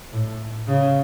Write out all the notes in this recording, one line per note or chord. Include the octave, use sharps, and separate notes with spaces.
A2
C#3